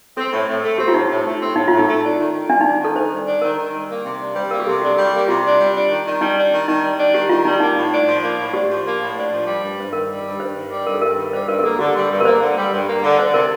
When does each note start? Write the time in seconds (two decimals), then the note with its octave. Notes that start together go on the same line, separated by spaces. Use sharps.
0.17 C4 A4
0.32 A2
0.48 A2
0.63 A3
0.78 C4 G4
0.88 F4
0.94 A2 D#4
1.10 A2
1.26 A3
1.41 C4
1.56 A2 D#4
1.68 A2 F4
1.79 D#4
1.87 A3
2.03 D4
2.18 D#3
2.33 D#3
2.49 G3 D4
2.61 D#4
2.65 D4
2.80 D#3 A4
2.96 D#3 C5
3.11 G3
3.27 D4
3.42 D#3 A#4
3.57 D#3
3.74 G3
3.89 A#3
4.04 C3
4.19 D4
4.35 G3 C5
4.51 A#3 A#4
4.60 G4
4.66 C3 A4
4.82 D4 G4
4.94 G3 A4
5.07 G4
5.13 A#3
5.28 C3 F4
5.44 D4
5.59 G3
5.75 D4
5.90 D#3
6.05 D#3
6.21 G3 D#4
6.37 D4
6.53 D#3
6.67 D#3 D#4
6.83 G3
6.99 D4
7.14 D#3 G4
7.29 D#3 F4
7.45 G3 D#4
7.60 A#3 D#4
7.76 A2
7.92 D4
8.07 F3
8.23 A#3
8.38 A2
8.54 D4 G4
8.69 F3
8.85 A#3
9.01 A2
9.16 D4
9.31 F3
9.47 G3
9.62 G2
9.78 G2 C5
9.93 D#3 A#4
10.09 G3
10.24 G2
10.39 G2 C5
10.55 D#3
10.71 G3
10.86 G2 A#4
10.94 A4
11.01 G2 A#4
11.17 D#3
11.33 G3 C5
11.48 G2 A#4
11.59 A#4
11.64 A#3 A4
11.79 D3 G4
11.95 G3
12.10 G2
12.20 A#4
12.25 A#3 C5
12.41 D3
12.57 G3
12.72 G2
12.88 A#3
13.03 D3
13.19 D4 C5
13.34 C3 A#4